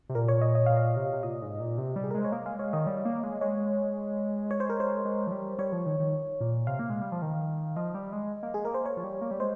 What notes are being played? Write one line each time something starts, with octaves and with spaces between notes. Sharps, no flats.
C3
A#2 A#4
C#5
D#5
D#5
A#2 F5
D#5
C3
C3
A#2 D#5
G#2
A#2
C3
G3
G#4
A#4
G#3 C5
C#5
A#3 D#5
G#3 F5
G#3 C#5
D#3 D#5
G3 D#5
A#3
G#3
G#3 C#5
C#5
C5
A#4
C5
G#3
F3
G3
G3 C#5
F3
D#3
D#3
A#2
C3 F5
A#3
G#3
G3
F3
D#3
F3 D#5
G3
G#3
A#3
G#3 G#4
A#3 A#4
C5
C#5
F3
G3
A#3
G3
G#3 C5